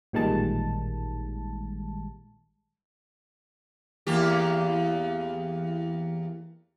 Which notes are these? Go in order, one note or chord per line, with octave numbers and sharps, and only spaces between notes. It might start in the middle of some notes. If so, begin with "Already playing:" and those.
A1 A#2 D#3 G3 G#3 A5
E2 A#3 G4